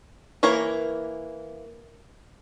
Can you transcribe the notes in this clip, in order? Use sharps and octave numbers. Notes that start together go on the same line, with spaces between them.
E3 A#3 A#4 C#5